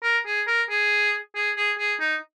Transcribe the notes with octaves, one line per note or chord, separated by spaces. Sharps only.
A#4
G#4
A#4
G#4
G#4
G#4
G#4
D#4